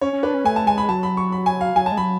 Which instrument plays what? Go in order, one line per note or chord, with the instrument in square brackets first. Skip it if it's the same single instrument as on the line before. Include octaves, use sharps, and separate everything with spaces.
[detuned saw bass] C#4 [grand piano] C#5
[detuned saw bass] C#4
[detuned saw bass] D4 [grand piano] B4
[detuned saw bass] C#4
[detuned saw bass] A3 [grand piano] G#5
[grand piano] A5
[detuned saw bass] G#3 [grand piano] G#5
[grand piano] B5
[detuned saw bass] F#3 [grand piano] A5
[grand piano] B5
C#6
B5
G#5
F5
[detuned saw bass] F#3 [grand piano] G#5
[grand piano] A5
[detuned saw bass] G#3
[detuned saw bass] F#3 [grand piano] B5